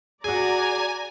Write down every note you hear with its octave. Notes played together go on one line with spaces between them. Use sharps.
F#4 G#4 D5 G#5 A#5